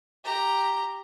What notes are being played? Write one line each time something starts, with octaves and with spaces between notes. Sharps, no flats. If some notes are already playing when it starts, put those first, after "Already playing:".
G4 A#5